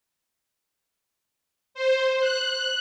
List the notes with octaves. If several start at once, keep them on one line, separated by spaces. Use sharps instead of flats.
C5
F#6